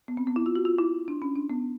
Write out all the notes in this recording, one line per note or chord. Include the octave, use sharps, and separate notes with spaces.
B3
C4
B3
E4
F4
F#4
F4
E4
D4
C#4
D4
B3